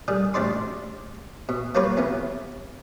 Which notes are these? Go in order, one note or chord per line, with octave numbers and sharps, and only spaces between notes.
D3 D#3 G3 G#4
A1 D2 D4 D5 C6
B2
F3 F#3 A#3 G4 B4 C#5
F2 E3 B3